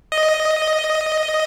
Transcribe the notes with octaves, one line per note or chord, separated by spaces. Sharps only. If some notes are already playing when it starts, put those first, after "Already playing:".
D#5